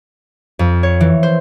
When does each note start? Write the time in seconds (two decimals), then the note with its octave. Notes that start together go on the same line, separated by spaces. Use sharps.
0.59 F2
0.83 C#5
1.01 E3
1.23 C5